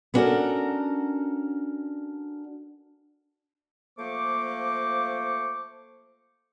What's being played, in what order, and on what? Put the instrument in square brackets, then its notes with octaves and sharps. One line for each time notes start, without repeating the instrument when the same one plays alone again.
[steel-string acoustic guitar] B3 C#4 D4 F#4 A4 A#4
[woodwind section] F3 A3 A#3 C5 C#6 D6